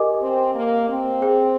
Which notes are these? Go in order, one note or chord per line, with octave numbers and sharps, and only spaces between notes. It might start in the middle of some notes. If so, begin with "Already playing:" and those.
Already playing: G4 A#4 D#5 G#5 D6
C4
A#3
C4
G#4 C5 G5